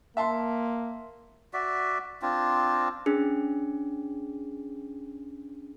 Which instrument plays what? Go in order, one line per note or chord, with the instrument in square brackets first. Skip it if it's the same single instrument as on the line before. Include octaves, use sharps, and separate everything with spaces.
[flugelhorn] A#3 [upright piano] E5 A5 C6
[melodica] F#4 D5 E5
C4 D4 F4
[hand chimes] C#4 D4 G#4